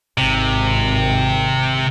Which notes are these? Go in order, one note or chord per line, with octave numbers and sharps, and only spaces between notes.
G#1 G#2 C3 D#3